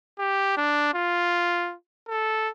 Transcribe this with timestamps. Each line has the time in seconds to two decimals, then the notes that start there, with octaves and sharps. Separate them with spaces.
0.19 G4
0.57 D4
0.94 F4
2.09 A4